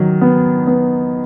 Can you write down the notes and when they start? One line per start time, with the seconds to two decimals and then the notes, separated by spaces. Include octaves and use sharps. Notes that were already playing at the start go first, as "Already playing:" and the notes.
Already playing: D#3 F#3
0.21 B3
0.67 B3